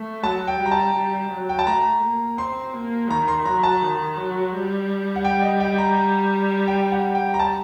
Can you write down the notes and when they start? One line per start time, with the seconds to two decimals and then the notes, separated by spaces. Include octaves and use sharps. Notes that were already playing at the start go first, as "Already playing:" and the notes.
Already playing: A3
0.23 F#3 A5
0.48 G5
0.59 G3
0.66 A#5
0.71 A5
0.96 G3
1.31 F#3
1.49 G5
1.59 A5
1.67 A3 A#5
2.03 A#3
2.38 C4 C6
2.74 A#3
3.10 D#3 A#5
3.28 C6
3.45 F#3 A#5
3.63 A5
3.82 D#3
4.18 F#3
4.53 G3
5.16 F#5
5.24 G5
5.42 D#5
5.60 G5
5.78 A#5
6.68 G5
6.92 F#5
7.15 G5
7.34 A#5
7.39 A5